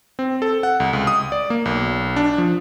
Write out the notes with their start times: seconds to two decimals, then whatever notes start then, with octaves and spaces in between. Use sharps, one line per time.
0.19 C4
0.42 A4
0.63 F#5
0.80 C2
0.93 C#2
1.07 D#6
1.32 D5
1.50 A#3
1.65 B1
2.16 D4
2.38 F3